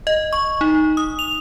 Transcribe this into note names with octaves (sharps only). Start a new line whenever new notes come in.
D#5
C#6
D#4
D#6
F7